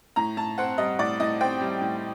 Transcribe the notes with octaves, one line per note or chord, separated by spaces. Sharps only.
A2 A#5
A2 A5
C4 F#5
G3 D#5
A2 D5
A2 D#5
C4 G5
G3
A2